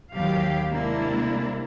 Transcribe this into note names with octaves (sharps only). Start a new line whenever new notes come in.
D#2 F#3 G4 F5
C3 G#3 A#3 D4 E4